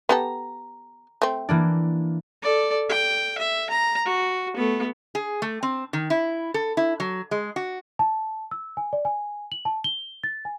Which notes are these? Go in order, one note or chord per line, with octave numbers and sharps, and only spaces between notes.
B3 G4 A4 A#5
A3 C4
E3 A#3 D4
A4 D5
G5
E5
A#5
F#4
A3 B3
G#4
A3
C4
D#3
E4
A4
E4
F#3
G#3
F#4
A5
E6
G#5
D5
G#5
F#7
A5
G7
A6
G#5